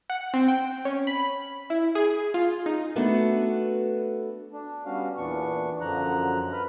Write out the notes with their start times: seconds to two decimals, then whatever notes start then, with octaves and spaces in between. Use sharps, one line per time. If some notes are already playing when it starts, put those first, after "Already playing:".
0.10 F#5
0.34 C4
0.48 G5
0.85 C#4
1.07 B5
1.70 E4
1.95 G#4
2.34 F4
2.66 D#4
2.96 A3 B3 D4 F#4 A4 B4
4.53 D4
4.85 G3 B3 C#4 F#4 F5
5.17 E2 A#2 E3 B3 D4 C#6
5.81 F#2 D3 F3 F#3 A#5 F#6
6.53 B4 B5 F6